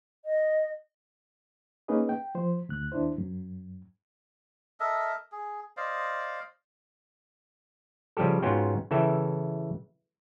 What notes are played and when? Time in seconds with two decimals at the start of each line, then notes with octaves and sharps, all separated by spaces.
0.25 D#5
1.88 A#3 C#4 D#4 G#4 B4 D#5
2.09 G5
2.35 F3 C5
2.69 D2 F#6
2.92 D#2 D4 E4 C5
3.18 F#2
4.80 A4 A#4 D#5 E5
5.32 G#4
5.77 C5 D5 D#5 F5
8.17 C#3 F3 G3 G4 A4
8.43 G#2 B3 C#4 F4 F#4 G5
8.91 C#3 E3 A4 E5 G5